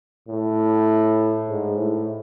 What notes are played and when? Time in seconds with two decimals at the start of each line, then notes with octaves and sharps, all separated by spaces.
0.28 A2
1.47 G#2
1.77 A2